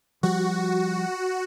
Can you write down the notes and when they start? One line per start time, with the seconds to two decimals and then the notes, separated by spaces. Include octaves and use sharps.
0.23 F3 G3 F#4